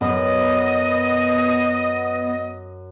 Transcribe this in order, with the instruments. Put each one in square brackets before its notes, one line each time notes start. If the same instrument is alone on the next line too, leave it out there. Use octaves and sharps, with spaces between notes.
[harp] F#2 [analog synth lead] B3 [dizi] D#5